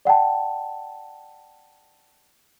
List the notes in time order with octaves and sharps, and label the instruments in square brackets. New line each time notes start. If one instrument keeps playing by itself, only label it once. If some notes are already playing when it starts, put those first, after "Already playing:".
[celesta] D5 F#5 G5 A5